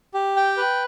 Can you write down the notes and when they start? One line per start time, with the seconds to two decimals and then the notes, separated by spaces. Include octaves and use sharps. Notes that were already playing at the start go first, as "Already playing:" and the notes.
0.14 G4
0.36 G5
0.57 B4